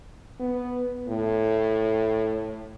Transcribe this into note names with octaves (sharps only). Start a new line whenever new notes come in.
B3
A2